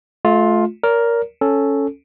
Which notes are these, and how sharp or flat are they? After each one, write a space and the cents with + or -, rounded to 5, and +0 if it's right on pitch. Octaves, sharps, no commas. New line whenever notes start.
A3 -30 F4 +10
A#4 +5 D5 -45
C#4 +0 A4 +0